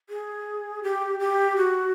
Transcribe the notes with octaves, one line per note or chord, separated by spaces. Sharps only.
G#4
G4
G4
F#4